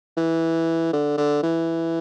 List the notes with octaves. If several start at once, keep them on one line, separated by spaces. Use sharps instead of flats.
E3
D3
D3
E3